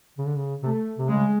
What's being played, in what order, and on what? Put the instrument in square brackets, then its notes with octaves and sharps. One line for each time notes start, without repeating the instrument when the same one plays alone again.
[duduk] C#3
D3
C#3
[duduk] C3 [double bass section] A3
[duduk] C3
[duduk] C#3 [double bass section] G#3